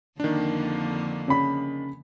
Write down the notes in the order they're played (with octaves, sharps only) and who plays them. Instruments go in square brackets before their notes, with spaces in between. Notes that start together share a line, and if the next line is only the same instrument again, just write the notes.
[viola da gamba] F2 D3 A#3 [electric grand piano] D#3 D4
[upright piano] C#3 B5